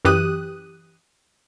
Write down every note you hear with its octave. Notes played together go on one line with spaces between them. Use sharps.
F#2 E3 G4 D#6 F#6 D#7